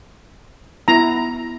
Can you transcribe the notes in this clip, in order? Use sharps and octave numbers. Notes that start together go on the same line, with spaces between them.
B3 E4 A#5